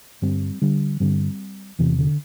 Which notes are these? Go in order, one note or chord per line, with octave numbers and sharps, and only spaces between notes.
G2 D3 G3 C4
D3 G3
G2 D3 G3 C4
E2 C3 E3
D3